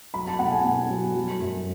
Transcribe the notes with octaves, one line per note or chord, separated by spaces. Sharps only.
F#3 B5
A5
B2 F#5
G#5
B2
F#3
F#3
F#2